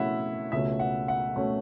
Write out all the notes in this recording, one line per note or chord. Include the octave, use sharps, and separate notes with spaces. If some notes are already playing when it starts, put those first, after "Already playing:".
Already playing: B2 A3 C#4 E4 E5 F#5
C#2 B2 A3 C#4 E5
F#5
F#5
B2 A3 C#4